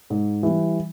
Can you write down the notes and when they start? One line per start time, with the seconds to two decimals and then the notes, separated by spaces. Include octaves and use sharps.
0.10 G#2
0.43 E3 G3